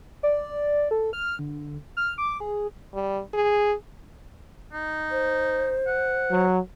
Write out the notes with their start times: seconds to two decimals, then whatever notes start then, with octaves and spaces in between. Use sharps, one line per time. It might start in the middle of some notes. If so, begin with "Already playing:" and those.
0.23 D5
0.91 A4
1.13 F6
1.39 D3
1.97 F6
2.18 D6
2.40 G#4
2.94 G3
3.33 G#4
4.73 D#4
5.11 C5
5.87 F#5
6.31 F#3